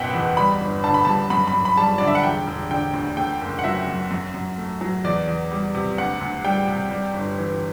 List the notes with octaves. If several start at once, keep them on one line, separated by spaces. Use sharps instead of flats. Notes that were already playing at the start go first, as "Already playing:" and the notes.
Already playing: F#1 B2 E5 F#5 G5
E2
G3 B5
G1
D3 A5
B5
G2 A5
F#2 B5
B5
F#2
B5
G3 A5
D3 D5
E5
F#5
E1 G5
E1
D3 G5
D2
A3 G5
F#1
F#5
F#3 E5
F#2
F#2
F#2
A3
F#3
E2 D5
E2
G3
C3
D2 F#5
D2
G3 G5
C3
G3
G1
E3